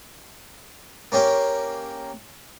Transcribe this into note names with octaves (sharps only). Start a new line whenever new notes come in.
A#3 C#4 G4 C#5